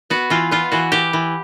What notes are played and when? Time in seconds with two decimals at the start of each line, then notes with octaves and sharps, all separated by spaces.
0.10 B3 F#4
0.30 E3 F4
0.51 B3 F4
0.72 E3 F#4
0.92 E3 G4
1.13 E3